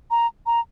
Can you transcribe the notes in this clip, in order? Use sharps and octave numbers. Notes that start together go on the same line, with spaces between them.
A#5
A#5